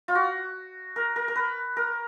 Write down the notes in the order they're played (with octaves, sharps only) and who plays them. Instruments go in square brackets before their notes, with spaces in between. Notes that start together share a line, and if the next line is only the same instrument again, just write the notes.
[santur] F4
F#4
A#4
A#4
A#4
B4
A#4